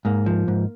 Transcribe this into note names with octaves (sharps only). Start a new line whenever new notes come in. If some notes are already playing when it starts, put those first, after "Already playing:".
G#2 A#3
F3
G#2